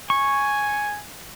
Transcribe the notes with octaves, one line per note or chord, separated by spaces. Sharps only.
G#5 C#6